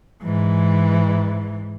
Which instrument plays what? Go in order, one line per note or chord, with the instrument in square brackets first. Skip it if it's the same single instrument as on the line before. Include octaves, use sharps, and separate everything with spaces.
[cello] G#2 E3